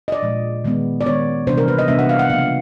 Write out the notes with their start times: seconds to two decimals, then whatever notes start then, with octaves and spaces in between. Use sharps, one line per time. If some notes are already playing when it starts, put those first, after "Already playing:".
0.08 D#5
0.12 D5
0.23 A#2 F3 G#3
0.64 D#3 G#3 B3
1.01 D5
1.05 D#3 G#3 B3 C#5
1.47 C3 E3 G3 B3 D4 C5
1.58 A#4
1.68 B4
1.78 D#5
1.88 C3 E3 G3 B3 D4 E5
1.99 F#5
2.09 F5
2.19 F#5
2.29 C#3 F3 A#3 D4 F5